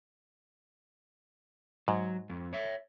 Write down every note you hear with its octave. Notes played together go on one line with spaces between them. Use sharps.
G#2 F#3
F2
C#5 E5